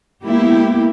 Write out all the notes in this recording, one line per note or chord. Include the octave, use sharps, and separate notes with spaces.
G#3 A#3 B3 E4 G4